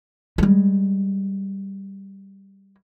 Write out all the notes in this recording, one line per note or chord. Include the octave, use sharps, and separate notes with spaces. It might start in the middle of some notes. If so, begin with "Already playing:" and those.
G3 G#3